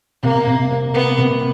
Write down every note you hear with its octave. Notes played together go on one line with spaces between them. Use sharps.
C3 A#3
C3
C3
A#3 B3
C3